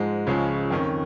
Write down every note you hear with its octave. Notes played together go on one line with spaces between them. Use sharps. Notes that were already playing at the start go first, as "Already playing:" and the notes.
Already playing: G#2 F3 G#3
C#2 C#3 F3 G#3 C#4
F2 D#3 C#4